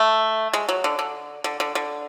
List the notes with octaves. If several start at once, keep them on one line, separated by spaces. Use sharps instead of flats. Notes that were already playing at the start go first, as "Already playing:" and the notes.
Already playing: A3
G#3
F#3
D3
D3
D3
D3
D3